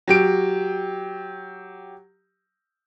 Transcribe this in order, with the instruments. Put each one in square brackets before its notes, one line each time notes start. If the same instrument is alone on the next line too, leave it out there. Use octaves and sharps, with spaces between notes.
[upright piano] F#3 G4 D7